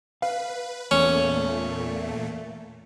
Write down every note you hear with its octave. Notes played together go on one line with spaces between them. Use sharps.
B4 F5
E2 A#2 A3 C#4